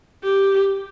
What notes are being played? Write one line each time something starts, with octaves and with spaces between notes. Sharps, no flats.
G4